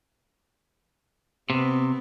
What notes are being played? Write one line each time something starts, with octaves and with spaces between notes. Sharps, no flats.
C3 B3 C4